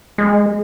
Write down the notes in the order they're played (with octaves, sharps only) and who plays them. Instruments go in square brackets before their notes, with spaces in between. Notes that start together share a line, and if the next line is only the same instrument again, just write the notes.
[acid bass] G#3